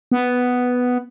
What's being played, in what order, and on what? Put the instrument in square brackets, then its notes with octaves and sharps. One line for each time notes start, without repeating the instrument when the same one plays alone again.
[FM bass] B3